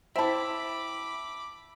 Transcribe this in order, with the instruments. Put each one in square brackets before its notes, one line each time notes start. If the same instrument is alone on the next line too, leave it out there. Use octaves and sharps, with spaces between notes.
[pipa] C4 E4 [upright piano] E5 A5 [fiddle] B5 D6